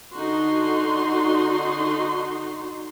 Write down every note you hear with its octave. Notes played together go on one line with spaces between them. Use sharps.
D3 D#4 F#4 C6